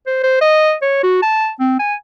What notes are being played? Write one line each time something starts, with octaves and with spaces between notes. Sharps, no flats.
C5
C5
D#5
C#5
F#4
A5
C4
G#5